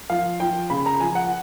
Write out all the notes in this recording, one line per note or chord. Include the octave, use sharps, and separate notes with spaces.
F3 F5
F3 G5
C#3 B5
A#5
F3 G#5
F#5